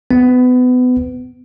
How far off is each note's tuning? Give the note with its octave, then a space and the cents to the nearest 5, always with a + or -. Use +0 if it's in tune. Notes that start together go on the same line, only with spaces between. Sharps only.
B3 +25